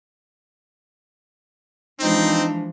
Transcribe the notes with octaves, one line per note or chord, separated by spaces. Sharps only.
E3 F3 G#3 C4 D4 D#4